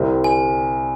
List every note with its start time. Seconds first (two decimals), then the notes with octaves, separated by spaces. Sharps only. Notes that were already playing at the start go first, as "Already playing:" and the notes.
Already playing: C2 C3 G3 C4
0.24 G#5